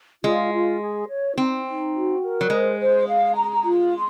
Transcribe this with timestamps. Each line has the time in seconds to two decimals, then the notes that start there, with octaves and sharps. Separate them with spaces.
0.24 G#3 F4
0.53 F4
0.81 G#4
1.09 C#5
1.37 C4 D#4
1.66 D#4
1.94 F#4
2.22 A#4
2.41 F#3
2.50 G#3 C5
2.79 C5
3.07 F5
3.35 A#5
3.63 F4
3.92 C6